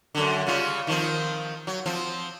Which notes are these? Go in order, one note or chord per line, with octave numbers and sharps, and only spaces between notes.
F#2 D3
C#3 G3 F4
D#3 F3 C4
F#3
F3 C4